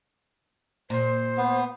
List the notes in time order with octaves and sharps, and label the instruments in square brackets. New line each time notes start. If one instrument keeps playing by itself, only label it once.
[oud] A#2 [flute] C5
[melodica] B3